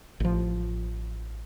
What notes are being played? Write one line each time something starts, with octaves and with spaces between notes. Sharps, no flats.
A1 F3